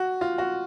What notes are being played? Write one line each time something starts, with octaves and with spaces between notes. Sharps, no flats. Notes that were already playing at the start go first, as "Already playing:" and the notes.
Already playing: F#4
F4
F#4